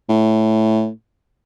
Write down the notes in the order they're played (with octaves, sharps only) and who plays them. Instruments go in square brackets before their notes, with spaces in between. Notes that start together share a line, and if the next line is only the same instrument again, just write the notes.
[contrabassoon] A2